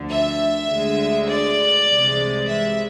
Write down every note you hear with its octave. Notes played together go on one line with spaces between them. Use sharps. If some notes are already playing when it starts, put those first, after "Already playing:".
Already playing: D2 D3 F3
E5
D2 D3 G#3
D5
C2 C3 E3 G#3
E5